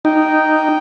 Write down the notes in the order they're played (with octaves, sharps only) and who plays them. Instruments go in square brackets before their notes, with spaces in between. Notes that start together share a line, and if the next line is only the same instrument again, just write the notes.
[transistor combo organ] D#4 [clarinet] G5